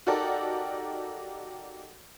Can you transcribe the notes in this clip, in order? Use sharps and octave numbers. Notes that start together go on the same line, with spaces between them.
D#4 F#4 G4 A4 A#4 D5